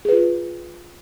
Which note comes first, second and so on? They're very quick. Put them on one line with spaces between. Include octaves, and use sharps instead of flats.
G#4 B4 F4